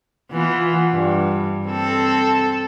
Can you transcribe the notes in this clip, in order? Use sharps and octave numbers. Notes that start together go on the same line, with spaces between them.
E3 B3 F4
G2
C4 A4